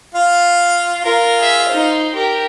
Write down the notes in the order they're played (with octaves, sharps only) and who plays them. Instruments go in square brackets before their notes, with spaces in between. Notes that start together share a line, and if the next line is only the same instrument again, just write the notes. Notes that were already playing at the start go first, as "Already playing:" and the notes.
[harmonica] F4 F5
[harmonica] F4 [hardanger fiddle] A#4
[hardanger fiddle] G#4 E5
D#4 C5
G4 A#4